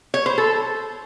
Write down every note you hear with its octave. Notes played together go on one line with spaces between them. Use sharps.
C#5
C5
A4